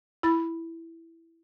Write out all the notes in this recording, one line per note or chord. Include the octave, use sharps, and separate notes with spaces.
E4 B5 A6